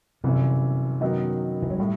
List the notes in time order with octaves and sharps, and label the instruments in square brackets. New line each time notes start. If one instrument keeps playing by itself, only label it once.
[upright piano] G1 F#2 E3 [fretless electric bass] C3
[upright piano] F#2 D#3 F#3 B3 D#4
[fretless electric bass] E3
F#3
[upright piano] A2 [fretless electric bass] G3